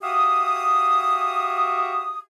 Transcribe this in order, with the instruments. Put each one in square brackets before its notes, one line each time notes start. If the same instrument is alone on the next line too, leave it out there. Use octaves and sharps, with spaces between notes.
[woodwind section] F#4 G4 E5 F5 D#6